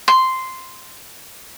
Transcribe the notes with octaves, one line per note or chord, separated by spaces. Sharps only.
C6